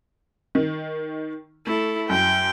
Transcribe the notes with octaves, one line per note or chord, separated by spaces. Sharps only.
D#3
A3 E4 A4
F#2 G5